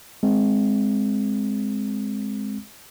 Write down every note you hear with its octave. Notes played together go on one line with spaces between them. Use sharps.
G#3 C4